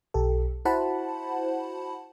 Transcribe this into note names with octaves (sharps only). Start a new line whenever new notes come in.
B1 G4 A4
E4 F#4 C5 F#5 A5 B5